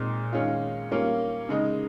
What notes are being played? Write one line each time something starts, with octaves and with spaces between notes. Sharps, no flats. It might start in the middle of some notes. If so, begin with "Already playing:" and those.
Already playing: A#2 G#3 C4 D#4
D#3 G#3 C#4 F4
G3 A#3 C#4 F4
C#3 G#3 D#4